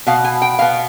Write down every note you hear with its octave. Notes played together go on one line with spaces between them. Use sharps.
B2 B3 F5
G#5
G5
B2 B3 F5